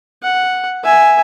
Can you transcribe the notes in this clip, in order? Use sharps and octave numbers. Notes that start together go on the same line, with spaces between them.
F#5
E5 G#5